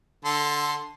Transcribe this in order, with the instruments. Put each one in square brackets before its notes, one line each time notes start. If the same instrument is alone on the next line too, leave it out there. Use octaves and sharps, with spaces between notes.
[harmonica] D3 A4 C6